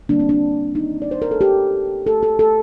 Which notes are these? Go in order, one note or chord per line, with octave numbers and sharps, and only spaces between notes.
D3 G3 A#3 D4
C4
D4
D#4
D5
C5
A#4
A4
G4
A4
A4
A4